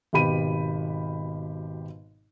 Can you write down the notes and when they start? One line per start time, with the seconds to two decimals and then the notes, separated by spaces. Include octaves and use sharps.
0.13 G#1 B2 G4 B5 D#7